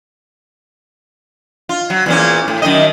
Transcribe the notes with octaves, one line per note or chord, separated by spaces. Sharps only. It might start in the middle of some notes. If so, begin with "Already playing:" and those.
F4
F#3
E2 A#2 C#4
A2
F#2 D#3 D#5